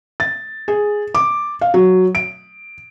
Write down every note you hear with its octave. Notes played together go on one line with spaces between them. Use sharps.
A6
G#4
D6
F5
F#3
D7